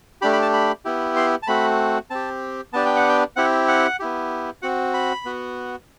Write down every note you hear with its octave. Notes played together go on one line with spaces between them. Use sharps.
A3 D4 G4 B5
B5
A5
B5
B3 E4 G4
C6
A5
A3 C4 F#4 B5
C4 G4 A5
B3 D4 G4 A5
G5
F#5
G5
C4 E4 G4 F#5
F#5
B3 E4 G4
C4 F#4 F#5
B5
B3 F#4